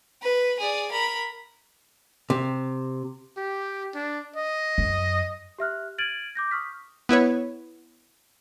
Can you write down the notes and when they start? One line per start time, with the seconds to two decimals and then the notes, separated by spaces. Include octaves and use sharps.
0.22 B4
0.59 G#4 D5
0.92 A#4 B5
2.30 C3
3.37 G4
3.95 D4
4.36 D#5
4.78 F#2
5.59 G4 E5 F6 F#6
5.98 F6 G#6 A6 D7 D#7 F#7
6.35 D6 G6 A#6
6.51 C#6 D#6 F6 B6
7.09 B3 E4 B4 C#5